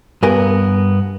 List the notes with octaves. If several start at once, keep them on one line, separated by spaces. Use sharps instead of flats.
G2 B3 A#4 G#5